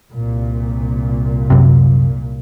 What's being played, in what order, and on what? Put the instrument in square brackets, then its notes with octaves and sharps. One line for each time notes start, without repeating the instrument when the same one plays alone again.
[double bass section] C2 A#2
[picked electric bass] F#2 C3